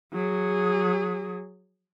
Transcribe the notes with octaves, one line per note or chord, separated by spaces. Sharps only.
F#3 G#4